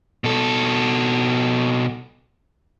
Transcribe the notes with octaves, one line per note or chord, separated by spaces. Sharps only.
B2 A4